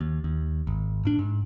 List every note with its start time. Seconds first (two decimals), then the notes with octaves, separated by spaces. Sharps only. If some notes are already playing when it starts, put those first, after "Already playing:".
0.01 D#2
0.24 D#2
0.67 G#1
1.05 A2 D4
1.19 G#2